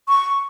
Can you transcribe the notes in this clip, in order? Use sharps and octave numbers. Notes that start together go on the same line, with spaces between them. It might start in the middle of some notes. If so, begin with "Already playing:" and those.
C#6